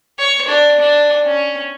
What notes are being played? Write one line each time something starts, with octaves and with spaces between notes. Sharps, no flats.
C#5
D4
D4
C#4